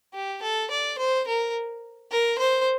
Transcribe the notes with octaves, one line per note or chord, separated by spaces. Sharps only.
G4
A4
D5
C5
A#4
A#4
C5